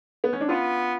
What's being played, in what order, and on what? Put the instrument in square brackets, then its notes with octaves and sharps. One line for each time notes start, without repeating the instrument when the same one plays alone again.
[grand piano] B3
C#4
D4
[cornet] B3 [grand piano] F4